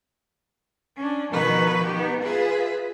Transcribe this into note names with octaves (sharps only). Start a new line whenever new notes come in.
C#4 D4
B2 D#3 F3 D#4 B4 C#6
B3 D#4 G4
F4 G#4 B4 E5